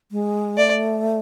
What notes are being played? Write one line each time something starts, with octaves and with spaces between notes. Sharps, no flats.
G#3
A3 D5